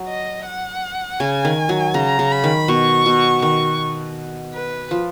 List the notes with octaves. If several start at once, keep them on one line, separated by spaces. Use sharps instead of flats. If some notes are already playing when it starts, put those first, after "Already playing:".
Already playing: F#3
D#5
F#5
C#3 G#5
D#3
F#3
C#3 A#5
C#3
B5
D#3
B2 C#6
B2
D#3 C#6
B4
F3